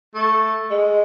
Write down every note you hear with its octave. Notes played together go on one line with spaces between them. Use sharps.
A3
G#3